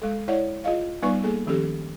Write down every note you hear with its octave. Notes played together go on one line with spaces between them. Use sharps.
G#3 A4
E4 C#5 D5 E5 F#5
F4 G#4 D#5 F5
G3 B3 D#4 B4 D5 C#6
A#3 G#4 A4
D#3 F3 C#4 G4 A4